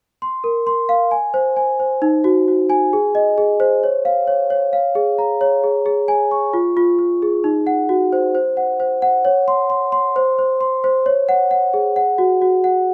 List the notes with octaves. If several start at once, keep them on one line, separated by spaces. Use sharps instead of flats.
C6
A#4
C6
F5
G#5
C5
G#5
C5
D#4
F#4
F#4
G#5
G#4
D#5
G#4
C5
C#5
F5
C#5
C#5
F5
G#4
A#5
C#5
G#4
G#4
G#5
C#6
F4
F4
F4
G#4
D#4
F#5
F#4
C5
C5
F#5
C5
F#5
C#5
C6
C6
C6
C5
C5
C6
C5
C#5
F#5
F#5
G#4
F#5
F#4
F#4
F#5